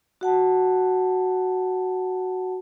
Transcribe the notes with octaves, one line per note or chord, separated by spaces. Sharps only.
F#4 F#5 A5